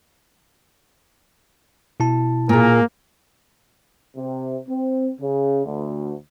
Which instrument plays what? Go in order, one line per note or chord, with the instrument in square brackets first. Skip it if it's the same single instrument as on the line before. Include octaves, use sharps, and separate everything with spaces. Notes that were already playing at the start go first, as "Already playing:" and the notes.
[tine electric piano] B2 E4 A5
[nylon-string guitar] A#2 G#4 [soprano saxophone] A#3 [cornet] A#4
[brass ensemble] C3
C4
C#3
D2